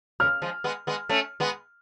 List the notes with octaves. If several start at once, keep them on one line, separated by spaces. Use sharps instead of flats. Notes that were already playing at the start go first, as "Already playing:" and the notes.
C#3 F6
F3 G#3
G#3 B3
G#3 B3
A3 C#4
G#3 B3